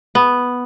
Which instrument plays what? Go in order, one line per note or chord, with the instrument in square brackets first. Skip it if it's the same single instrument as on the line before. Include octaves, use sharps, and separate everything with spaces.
[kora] B3